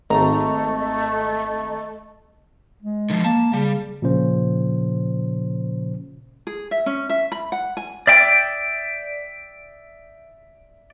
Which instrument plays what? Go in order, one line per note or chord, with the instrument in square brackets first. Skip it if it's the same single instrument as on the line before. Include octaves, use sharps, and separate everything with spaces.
[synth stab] G#1 A#5 [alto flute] A3 [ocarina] D#5
[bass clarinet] G#3
[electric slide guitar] D3 F3
[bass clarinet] A#3 [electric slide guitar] A5
[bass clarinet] C#3 [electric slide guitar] G3
[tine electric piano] A#2 C#3 F3 C#4 C5
[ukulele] G#4
E5
C#4
E5
B5
F#5
G#5
[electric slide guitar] D5 E5 G5